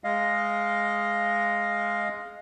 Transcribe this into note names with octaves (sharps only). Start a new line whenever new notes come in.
G#3 D#5 F5